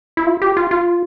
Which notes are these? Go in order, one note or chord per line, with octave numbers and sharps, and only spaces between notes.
E4
F4
G4
F4
F4